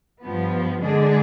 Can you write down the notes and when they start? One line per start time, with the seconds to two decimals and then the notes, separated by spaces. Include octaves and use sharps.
0.21 G2 F3 B3
0.81 D3 G#3 D4 G#4